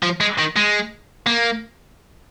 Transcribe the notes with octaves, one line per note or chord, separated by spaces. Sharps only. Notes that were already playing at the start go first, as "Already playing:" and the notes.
F3
G#3
D#3
G#3
A#3